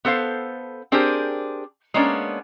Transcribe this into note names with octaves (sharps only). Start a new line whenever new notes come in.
B3 A4 C5 F5
C4 D4 G4 G#4 A#4 C5
G#3 A#3 B3 C#4 D4 D5